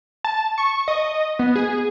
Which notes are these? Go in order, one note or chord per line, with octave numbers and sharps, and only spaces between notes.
A5
C#6
D#5
B3
G#4